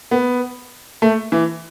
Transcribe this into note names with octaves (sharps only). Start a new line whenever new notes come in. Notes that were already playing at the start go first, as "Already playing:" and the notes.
B3
A3
E3